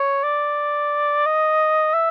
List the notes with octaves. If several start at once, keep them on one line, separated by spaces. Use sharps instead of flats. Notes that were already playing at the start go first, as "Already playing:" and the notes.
Already playing: C#5
D5
D#5
E5